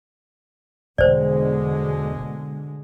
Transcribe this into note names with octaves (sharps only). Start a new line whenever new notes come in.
E1 B2 D3 G#3 C5 D5